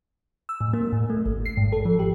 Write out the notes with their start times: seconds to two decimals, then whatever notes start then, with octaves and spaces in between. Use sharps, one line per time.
0.49 E6
0.61 A2
0.73 A#3
0.92 A2
1.10 A3
1.26 G#1
1.46 C7
1.57 G#2
1.72 A4
1.85 F3
1.99 G4